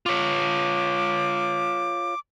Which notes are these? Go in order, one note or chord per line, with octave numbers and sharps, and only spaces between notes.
F4 C#5 D6